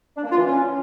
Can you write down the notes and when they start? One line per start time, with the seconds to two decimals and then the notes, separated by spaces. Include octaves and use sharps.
0.17 D4
0.24 A#3
0.31 F4
0.38 E3
0.45 C#4